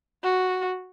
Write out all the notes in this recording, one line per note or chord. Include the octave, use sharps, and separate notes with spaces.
F#4